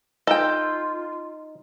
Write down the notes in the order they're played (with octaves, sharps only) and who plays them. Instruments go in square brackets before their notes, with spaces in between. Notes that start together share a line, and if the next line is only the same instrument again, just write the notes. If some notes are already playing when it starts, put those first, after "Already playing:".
[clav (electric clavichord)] D#4 [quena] F4 [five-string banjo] A4 G5